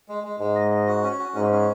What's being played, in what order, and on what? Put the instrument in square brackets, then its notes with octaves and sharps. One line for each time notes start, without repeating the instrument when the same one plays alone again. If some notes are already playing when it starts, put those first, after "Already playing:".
[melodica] G#3
G#3
[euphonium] G#2 [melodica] G#3
[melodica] D#5
D#5
F#4
C#4
F#4
[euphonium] G#2 [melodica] C#4
[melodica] C#4